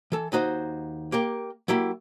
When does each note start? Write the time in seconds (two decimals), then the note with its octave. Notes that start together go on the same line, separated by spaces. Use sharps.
0.12 E3 A4
0.32 D#2 D#4 F#4 C5
1.12 A#3 G4 A#4 G5
1.68 F#3 A#3 E4 G4